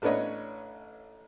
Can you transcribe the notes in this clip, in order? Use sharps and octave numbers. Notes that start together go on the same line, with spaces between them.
A1 A3 D4 B4 C#5 D#5